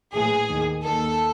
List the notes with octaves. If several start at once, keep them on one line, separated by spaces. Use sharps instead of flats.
A#1 A2 E3 G#4
D#2 D#3
D#2 D#3 A4